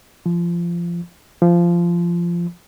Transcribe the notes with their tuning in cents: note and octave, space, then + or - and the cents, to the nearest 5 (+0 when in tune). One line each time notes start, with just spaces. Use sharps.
F3 -20
F3 -15